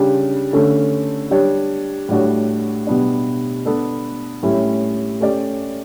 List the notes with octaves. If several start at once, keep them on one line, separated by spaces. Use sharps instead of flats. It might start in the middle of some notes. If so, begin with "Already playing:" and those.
Already playing: C#3 G3 D4 G4
D3 A3 C#4
G3 D4 G4 C#5
A2 G3 D4 F#4 C#5
B2 G3 B3 D4
B3 D4 A4
A2 G3 C#4 E4
A3 C#4 G4 D5